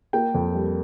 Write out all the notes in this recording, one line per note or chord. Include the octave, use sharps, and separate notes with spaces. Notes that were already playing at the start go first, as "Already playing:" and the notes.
A#3 G5
F2
G3